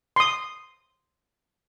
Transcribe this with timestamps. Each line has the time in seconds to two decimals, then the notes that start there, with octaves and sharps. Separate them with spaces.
0.16 C6 D#6